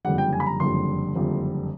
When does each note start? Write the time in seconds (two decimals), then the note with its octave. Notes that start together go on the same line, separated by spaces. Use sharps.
0.05 F#1 F2 D3 G3 F#5
0.18 G5
0.33 G#5
0.40 B5
0.46 A#5
0.60 F#1 F2 D3 G3 C6
1.15 F#1 F2 D3 G3